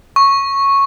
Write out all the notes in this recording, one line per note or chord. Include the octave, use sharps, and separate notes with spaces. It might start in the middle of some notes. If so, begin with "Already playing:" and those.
C#6